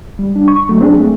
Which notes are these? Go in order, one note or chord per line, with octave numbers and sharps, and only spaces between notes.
G3
D4
C#6
F#3 A3
C4 D4 G#4
A3